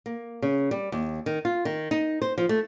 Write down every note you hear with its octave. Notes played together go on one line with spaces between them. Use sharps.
A#3
C#3
G3
D#2
D#3
F4
D#3
D#4
C5
F3
A3